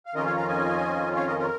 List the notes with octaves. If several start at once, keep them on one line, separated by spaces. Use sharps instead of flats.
F5
F2 D#3 C#4 F4 A#4 D#5
C#5 F5
F5 A#5
D#5 G#5
C#5 F5
A#4 D#5
F4 A#4